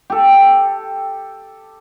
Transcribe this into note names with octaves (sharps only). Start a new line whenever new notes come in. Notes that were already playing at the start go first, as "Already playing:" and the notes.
G4 A4